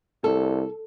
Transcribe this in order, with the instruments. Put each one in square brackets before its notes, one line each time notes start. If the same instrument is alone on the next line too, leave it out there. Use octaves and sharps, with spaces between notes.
[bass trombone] C2 [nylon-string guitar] A4